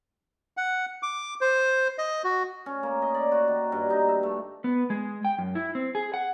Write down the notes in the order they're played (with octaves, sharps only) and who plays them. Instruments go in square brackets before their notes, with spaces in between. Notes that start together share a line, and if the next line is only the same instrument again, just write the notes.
[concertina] F#5
D6
C5
D#5
F#4
[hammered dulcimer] C#4
A#3
D#5
D5
F#4
D#3
G2
D#4
E5
A3
[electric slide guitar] B3
G#3
G5
F#2
E4
C4
G#4
F#5